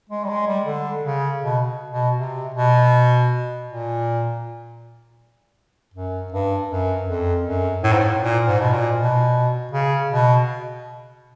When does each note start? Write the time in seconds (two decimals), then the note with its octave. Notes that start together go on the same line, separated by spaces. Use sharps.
0.10 G#3
0.24 G3
0.29 G#3
0.47 G3
0.66 D3
1.04 C#3
1.42 B2
1.92 B2
2.18 C3
2.55 B2
3.68 A#2
5.94 F#2
6.32 G2
6.70 F#2
7.08 F2
7.46 F#2
7.84 A2
7.92 G#2
8.00 A2
8.21 A#2
8.46 G#2
8.60 B2
8.72 A#2
8.96 B2
9.72 C#3
10.10 B2